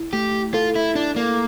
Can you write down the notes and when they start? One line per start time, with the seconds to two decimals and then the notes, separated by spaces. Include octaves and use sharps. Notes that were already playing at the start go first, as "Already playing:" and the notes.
Already playing: E4
0.13 A3 G4
0.54 F4 A4
0.75 E4
0.95 D4 E4
1.16 A#3